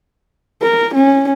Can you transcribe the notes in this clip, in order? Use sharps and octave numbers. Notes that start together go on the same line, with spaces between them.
A#4
C#4